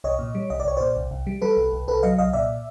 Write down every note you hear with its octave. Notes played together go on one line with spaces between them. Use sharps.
C2 C#5 D#5
A#2
G3
C2 D#5
D5
C2 C#5
A#2 C5 D5
C2
C2
G3
G3 A4 B4
C2
C2
C2 A4 B4
F#3 D#5 F5
C2 D#5 F5
A#2 D5 E5